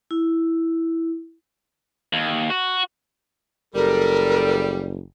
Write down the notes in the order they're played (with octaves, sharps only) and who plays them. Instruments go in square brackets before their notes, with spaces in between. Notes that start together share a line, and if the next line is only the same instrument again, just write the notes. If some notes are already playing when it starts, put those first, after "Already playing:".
[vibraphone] E4
[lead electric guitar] D#2
F#4
[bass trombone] F#1 [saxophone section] G3 [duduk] A4 [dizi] A#4